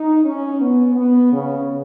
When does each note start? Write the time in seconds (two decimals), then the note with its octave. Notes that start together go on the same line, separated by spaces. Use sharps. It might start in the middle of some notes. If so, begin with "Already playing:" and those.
Already playing: D#4
0.24 C#4
0.60 B3
0.96 B3
1.31 C#3